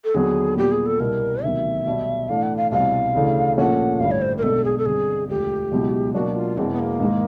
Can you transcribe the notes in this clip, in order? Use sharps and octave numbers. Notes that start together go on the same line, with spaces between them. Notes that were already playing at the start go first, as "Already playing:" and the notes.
A4
D#2 D3 F#3 B3 G#4
A#2 G3 B3 G4
G#4
A4
C2 B2 G3 A#4
D2 C3 D#3 F#3 B3 E5
B1 B2 G3
A2 E3 A3 D4 F5
F#5
F5
C2 B2 G3 C4 F5
D2 C#3 E3 A3 D4
A#1 A#2 F3 A3 C#4 F#5
A1 G2 D3 G3 F5
C#5
C5
A#4
B1 B2 G#3 B3 D4 A4
G#4
A4
G2 D3 G3 C4 G#4
E1 D2 D3 F3 A3 G4
C#2 B2 F#3 B3 E4
B2 F#3 A#3 D4 F#4
F4
E1 E2 B2 C4
B3
A#3
G#2 D#3 G#3